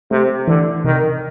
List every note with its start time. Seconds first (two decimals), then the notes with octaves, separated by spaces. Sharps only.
0.11 C3 A3
0.47 D3 E3
0.85 C3 D#3